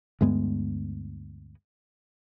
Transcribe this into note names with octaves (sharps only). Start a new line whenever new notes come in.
D2 G2 G#3 B3